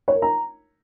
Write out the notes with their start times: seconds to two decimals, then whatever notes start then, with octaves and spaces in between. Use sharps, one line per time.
0.08 C#5
0.15 A#4
0.22 A#5